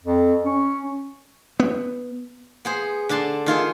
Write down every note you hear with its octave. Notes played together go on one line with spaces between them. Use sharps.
F2
C#4
B3
B3 G#4 C5
D3 D4 A5 C6
D#3 F4 G#4 A4